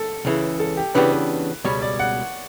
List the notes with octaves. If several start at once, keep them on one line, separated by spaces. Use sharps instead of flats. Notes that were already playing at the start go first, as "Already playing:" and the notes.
Already playing: A4
C#2 C#3 E3
A4
G4
C#3 E3 B3 D4 G4 B4
B4
C#2 B2 G3 C#5
D5
F#5